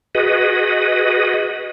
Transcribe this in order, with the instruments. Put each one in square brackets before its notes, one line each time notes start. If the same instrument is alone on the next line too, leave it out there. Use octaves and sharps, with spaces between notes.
[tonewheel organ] F#4 G#4 B4 D#5